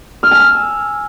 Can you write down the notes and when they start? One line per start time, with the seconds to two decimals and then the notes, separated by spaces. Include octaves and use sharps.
0.23 F6
0.31 G#5
0.40 E6